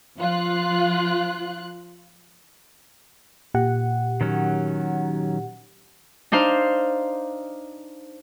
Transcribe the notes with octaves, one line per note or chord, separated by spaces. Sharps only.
F3 F4 F#6
A#2 G4 F#5
D#3 F#3 C#4
D4 D#4 C5 F5